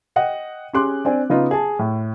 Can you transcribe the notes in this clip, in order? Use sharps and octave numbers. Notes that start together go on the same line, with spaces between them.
D#5 F#5 G5
C#4 G4 G#4 C6 D6 F#6
C4 D4 G#5
C#3 B3 D#4 F4
G#4 A5
A2